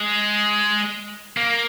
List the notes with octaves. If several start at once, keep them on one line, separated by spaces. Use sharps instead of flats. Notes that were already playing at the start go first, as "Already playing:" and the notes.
Already playing: G#3
A#3